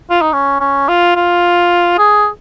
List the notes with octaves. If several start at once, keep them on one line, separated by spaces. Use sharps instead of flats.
F4
D#4
C#4
C#4
F4
F4
G#4